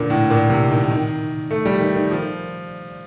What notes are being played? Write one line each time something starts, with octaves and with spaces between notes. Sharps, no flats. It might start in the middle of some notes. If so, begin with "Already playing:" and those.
Already playing: A#2 D3
A2
A#2
C3
D#3
D#3
A3
G3
D#3
D#3
F3